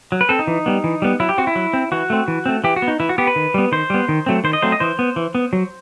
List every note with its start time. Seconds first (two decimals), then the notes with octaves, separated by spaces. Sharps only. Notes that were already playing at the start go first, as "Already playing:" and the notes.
0.12 F#3
0.21 B4
0.29 C4 A4
0.39 D#4
0.47 E3
0.66 G3 B3
0.84 E3
1.02 G3 B3
1.20 F#3 E4
1.29 G4
1.38 C4 F#4
1.47 E4
1.56 F#3
1.73 C4
1.92 E3 F#4
2.10 A3 C4
2.28 E3
2.46 A3 C4
2.64 E3 G4
2.76 F#4
2.82 B3
2.88 D#4
3.00 E3 E4
3.09 F#4
3.18 B3 G4
3.27 B4
3.36 D#3
3.54 G3 B3
3.72 D#3 C5
3.90 G3 B3
4.09 D#3
4.26 F#3 A3 C4
4.44 D#3 C5
4.53 D#5
4.62 F#3 A3 C4 C5
4.72 D#5
4.80 E3 C5
4.99 B3
5.16 E3
5.35 B3
5.53 F#3